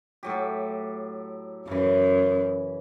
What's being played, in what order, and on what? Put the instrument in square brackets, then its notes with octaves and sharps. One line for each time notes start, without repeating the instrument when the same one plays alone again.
[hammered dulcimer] A2 F#3 G4
[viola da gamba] F#2 [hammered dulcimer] C#3 E3